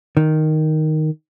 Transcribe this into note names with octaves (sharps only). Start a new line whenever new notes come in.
D#3